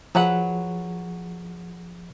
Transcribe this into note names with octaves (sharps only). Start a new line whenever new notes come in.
F3 F#3 G#4 B4 F#5